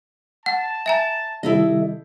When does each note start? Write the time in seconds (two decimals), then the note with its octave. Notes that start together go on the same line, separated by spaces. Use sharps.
0.46 F#5 A5
0.86 E5 G#5 A#5
1.43 C3 D#3 G3 E4 A4 D#5